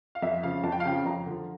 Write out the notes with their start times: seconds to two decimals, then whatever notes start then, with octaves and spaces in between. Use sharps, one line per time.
0.15 F5
0.22 F2 E5
0.43 C#3 F3 F5
0.64 F2 A5
0.72 G5
0.80 F5
0.85 C#3 F3 G5
1.06 F2 A#5
1.26 D3 F3